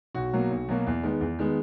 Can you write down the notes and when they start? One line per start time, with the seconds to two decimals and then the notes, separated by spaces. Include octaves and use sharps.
0.15 B1 F#4
0.33 B2 F#3 A#3
0.50 B1
0.68 B2 F#3 A#3
0.86 E2
1.03 D#3 G#3 B3
1.21 E2
1.39 D#3 G#3 B3